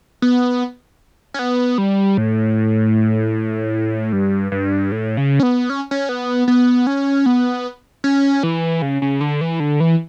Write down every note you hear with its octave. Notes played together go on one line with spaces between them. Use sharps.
B3
C#4
B3
G3
A2
G2
G2
A2
C#3
C#4
B3
C#4
C#4
B3
B3
C#4
B3
C#4
E3
C#3
C#3
D3
E3
D3
E3